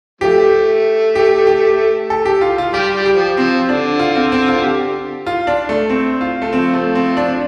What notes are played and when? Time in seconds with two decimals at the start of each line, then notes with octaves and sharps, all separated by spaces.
0.21 F3 A3 G4
1.15 G4
1.47 G4
2.10 A4
2.25 G4
2.41 F4
2.58 F4
2.73 G3 G4
2.94 G3
3.06 G4
3.16 F3
3.37 F3 C4
3.69 D3 D4
3.99 F4
4.15 C4
4.32 C4
4.48 F4
4.63 G4
5.27 F4
5.47 D4
5.69 A3
5.90 C4
6.21 F4
6.42 A3
6.53 F3 C4
6.73 A3
6.95 C4
7.17 D4